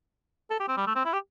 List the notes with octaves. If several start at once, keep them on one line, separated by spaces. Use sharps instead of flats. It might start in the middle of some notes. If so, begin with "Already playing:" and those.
A4
G4
C4
G3
A3
C4
E4
G4